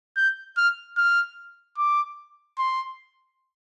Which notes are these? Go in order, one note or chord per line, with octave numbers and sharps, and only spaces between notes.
G6
F6
F6
D6
C6